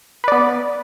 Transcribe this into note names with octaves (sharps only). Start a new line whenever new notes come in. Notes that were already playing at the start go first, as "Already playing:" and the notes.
B3 B4 D5